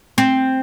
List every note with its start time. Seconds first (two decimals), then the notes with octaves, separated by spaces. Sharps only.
0.18 C4